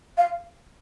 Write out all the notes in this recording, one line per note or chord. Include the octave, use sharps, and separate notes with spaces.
F5